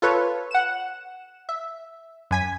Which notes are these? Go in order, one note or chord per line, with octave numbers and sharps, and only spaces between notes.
F4 A4 B4 C#5
F#5 E7
E5
F#2 G#5 B6